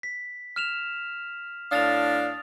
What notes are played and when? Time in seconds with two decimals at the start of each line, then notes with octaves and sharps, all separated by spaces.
0.03 B6
0.56 F6 E7 F7
1.71 A2 D4 F5 D#6 A6 F7